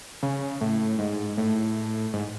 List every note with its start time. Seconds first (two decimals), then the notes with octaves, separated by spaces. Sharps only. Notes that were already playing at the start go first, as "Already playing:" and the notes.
0.23 C#3
0.61 A2
0.99 G#2
1.37 A2
2.13 G#2